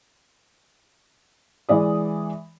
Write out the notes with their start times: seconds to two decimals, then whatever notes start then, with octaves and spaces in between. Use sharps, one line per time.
1.69 E3 G#3 D5 D#6